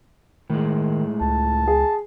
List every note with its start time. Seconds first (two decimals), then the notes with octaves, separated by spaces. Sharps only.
0.50 A2 D#3 G#3
1.21 C#2 A5
1.68 G#4